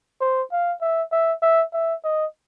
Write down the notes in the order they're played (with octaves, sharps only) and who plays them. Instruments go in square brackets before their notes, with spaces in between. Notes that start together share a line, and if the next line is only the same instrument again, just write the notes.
[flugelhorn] C5
F5
E5
E5
E5
E5
D#5